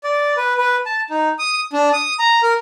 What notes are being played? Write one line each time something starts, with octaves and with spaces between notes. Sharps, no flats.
D5
B4
B4
A5
D#4
D#6
D4
D#6
A#5
A#4